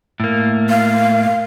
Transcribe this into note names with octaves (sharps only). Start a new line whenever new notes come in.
A2 A#3
F5